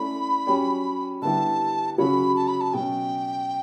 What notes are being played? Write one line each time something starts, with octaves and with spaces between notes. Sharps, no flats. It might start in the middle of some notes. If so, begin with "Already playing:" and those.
Already playing: A3 C#4 E4 A4 D5 B5
F#3 C#4 G4 C#5
D3 G3 B3 E4 G4 A5
C#3 F#3 C#4 F#4 C#5 B5
A5
B5
A5
B2 F#3 C#4 G5